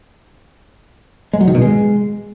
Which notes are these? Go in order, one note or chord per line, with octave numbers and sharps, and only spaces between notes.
G#3
F#3
D#3
B2
G#3